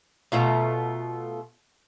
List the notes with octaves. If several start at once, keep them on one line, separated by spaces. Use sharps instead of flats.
B2 A3 F4 A#5